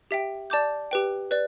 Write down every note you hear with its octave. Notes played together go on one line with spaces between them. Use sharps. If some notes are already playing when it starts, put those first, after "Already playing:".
G4 E5 G5
D5 A5 D6 G6
G4 B4 G5
B4 D5